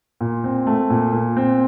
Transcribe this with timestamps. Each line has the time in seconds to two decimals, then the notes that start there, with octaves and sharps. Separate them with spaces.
0.21 A#2
0.44 C4
0.67 A3
0.90 A#2
1.13 A#2
1.37 C4